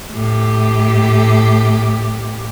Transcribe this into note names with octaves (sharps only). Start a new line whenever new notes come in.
A2 G4